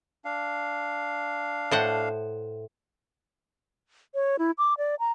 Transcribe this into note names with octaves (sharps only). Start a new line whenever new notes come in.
D4 F5
A2 C5 F#5
C#5
E4
D6
D5
A#5